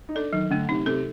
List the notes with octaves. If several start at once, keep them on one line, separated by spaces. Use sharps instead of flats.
D#4
D4 A4
D#3 F#3
D3 A3
C3 D#4
C3 A4